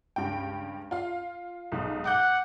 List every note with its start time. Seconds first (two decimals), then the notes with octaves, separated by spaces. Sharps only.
0.16 C#2 G2 G5
0.91 F4 F5
1.72 B1 G#2
2.05 F#5 D6 G6